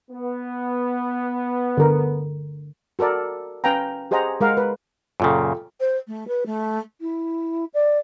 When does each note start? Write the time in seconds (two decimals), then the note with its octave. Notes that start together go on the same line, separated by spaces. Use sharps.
0.10 B3
1.77 D3 A#4
2.99 F#4 A4 A#4 D5
3.64 C#4 B4 F5 G5 G#5 A#5
4.11 G4 G#4 C5 D#5 F#5 A#5
4.41 G#3 A#4 F5 F#5
4.57 B4
5.20 F#2 A#2 C#3 F4 A4 G5
5.80 C5
6.07 A3
6.27 B4
6.46 A3
7.01 E4
7.74 D5